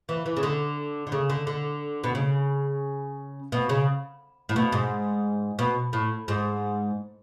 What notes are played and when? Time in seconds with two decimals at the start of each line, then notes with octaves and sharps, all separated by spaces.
0.09 E3
0.26 E3
0.37 C#3
0.43 D3
1.07 D3
1.12 C#3
1.30 D3
1.47 D3
2.04 B2
2.15 C#3
3.52 B2
3.69 C#3
4.49 A2
4.56 B2
4.72 G#2
5.59 B2
5.93 A2
6.28 G#2